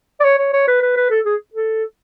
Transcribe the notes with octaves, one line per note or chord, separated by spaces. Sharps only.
D5
C#5
C#5
C#5
B4
B4
B4
A4
G#4
A4